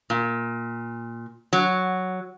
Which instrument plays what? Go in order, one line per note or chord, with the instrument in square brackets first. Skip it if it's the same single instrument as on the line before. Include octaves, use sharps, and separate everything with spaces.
[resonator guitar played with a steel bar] A#2
F#3